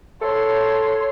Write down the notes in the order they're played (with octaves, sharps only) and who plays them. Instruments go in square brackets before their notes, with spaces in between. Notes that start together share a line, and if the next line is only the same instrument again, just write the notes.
[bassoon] A4 [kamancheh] C#5 C6